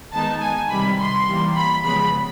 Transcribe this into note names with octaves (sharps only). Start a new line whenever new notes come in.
D#3 G#3 B3 D#4 A5
G#5
C3 D#3 G3 B5
C6
E3 G3 A#3
B5
C#3 F3 G#3 B3 B5